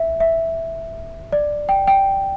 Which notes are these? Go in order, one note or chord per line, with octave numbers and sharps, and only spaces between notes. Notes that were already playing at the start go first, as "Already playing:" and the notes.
Already playing: E5
E5
D5
G5
G5